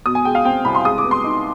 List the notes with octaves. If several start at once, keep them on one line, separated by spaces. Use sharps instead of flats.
B2 D#6
G#5
G#3 G5
F5
C4 G5
C2 B5
C6
G#3 D#6
D6
B3
C6
D#4